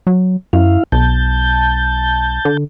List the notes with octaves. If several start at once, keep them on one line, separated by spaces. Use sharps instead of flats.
F#3
F#2 E4 F5
B1 A5 G6
D3